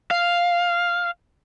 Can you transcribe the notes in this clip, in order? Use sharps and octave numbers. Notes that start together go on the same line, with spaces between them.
F5